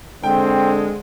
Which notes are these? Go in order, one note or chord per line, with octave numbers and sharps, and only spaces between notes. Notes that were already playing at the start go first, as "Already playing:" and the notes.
D3 G#3 C4 G5